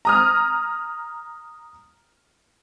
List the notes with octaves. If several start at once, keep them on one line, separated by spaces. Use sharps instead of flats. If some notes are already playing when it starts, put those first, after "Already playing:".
A#5 D#6 F6